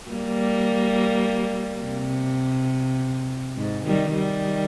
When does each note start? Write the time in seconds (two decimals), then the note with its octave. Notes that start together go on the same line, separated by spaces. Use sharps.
0.11 G3 A#3
1.84 C3
3.56 G#2
3.86 D#3 G3
4.14 D#3 G3